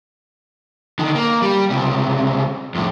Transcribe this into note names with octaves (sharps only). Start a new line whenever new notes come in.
D3 D#3
A#3
G3
C#2 C3
F2 A2